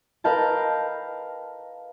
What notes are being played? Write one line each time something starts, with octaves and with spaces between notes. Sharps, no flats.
A#4 B4 D#5 F5 G5 A5